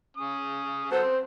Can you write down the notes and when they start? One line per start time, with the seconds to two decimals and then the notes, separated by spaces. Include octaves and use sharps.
0.17 C#4 D#6
0.91 F#3 B3 A4 C5
1.02 C4